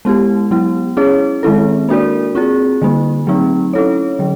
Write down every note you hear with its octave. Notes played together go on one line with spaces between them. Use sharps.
G#3 B3 E4 G4
F#3 B3 E4
C#4 E4 G#4 C#5
D#3 G#3 C4 E4 A4
A#3 D4 F#4 A#4 D5
C4 F4 G#4
D3 G3 A#3
F#3 A3 C4 D#4
C#4 E4 A4 C#5
D3 F#3